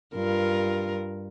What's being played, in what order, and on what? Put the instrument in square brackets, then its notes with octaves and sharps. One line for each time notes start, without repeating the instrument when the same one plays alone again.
[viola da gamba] G2 F4 A#4